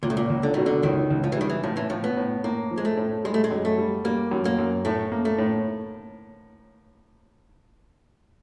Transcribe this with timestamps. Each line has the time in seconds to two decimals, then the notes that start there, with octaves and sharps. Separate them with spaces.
0.03 C#2 A#2
0.10 A2
0.17 A#2
0.30 C#2
0.43 D3
0.54 B2 D#3
0.66 D3
0.83 C#2 D#3
1.10 C#2
1.24 F3
1.32 E3
1.37 D#3 G3
1.50 E3
1.63 A2 F3
1.77 E3
1.90 A2 F3
2.04 B3
2.17 A2
2.44 A2 A#3
2.71 F3
2.78 G#3
2.85 A3
2.97 A2
3.25 G3 G#3
3.34 A3
3.44 G#3
3.51 F#2
3.65 A3
3.78 G3
4.04 G3 A#3
4.31 F#2
4.45 A#3
4.59 F#2
4.85 A2 A3
5.12 A#3
5.25 A3
5.38 A2